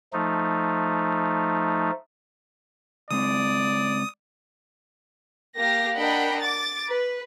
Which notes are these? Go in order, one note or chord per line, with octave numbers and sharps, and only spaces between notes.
F3 A3 D#4
C#3 G#3 C4 D5 D#6
A#3 G4 F5 A#6
D4 A#4 D#5 F#5 G5 B5
D6 A6
B4